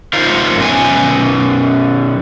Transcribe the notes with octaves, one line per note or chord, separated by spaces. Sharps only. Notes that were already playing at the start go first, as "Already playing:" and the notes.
A3 D#4 F4 A#4 C5 F5
F#2 B2 G#5